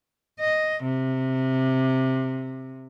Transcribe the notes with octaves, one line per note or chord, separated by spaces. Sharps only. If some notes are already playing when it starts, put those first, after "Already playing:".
D#5
C3